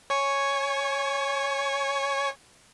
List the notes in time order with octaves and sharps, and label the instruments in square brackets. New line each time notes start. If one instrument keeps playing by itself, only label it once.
[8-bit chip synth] C#5 G#5 C#6